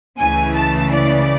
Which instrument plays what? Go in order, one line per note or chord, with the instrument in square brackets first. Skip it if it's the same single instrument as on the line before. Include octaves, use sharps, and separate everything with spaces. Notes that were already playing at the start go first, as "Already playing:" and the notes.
[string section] C#2 C#3 E3 A3 G#5
A5
D5